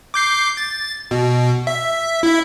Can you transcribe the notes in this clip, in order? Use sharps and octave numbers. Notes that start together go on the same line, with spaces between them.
D6 G6 C7
A6
B2
E5
E4 E5